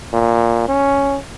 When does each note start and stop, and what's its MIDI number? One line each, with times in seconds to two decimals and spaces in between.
0.13 0.67 46
0.68 1.18 61